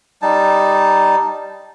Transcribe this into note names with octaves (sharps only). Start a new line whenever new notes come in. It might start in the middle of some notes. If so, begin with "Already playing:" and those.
G3 D#4 A5